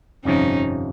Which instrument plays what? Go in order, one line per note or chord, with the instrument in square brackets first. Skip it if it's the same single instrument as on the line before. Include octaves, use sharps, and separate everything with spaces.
[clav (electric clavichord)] G1 F2 C3 F3 [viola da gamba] C#4 D#4